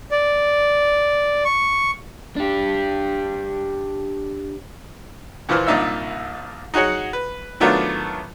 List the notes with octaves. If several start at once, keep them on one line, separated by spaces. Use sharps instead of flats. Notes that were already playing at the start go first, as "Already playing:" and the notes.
D5
C#6
D4 G4
D#2 A#2 E3 C5 F6
C2 A#2 D4 D#4 E5 E6
D#4 F#4 G#4 C#5 F#5
B4
D#3 F#3 A3 B3 D4 F4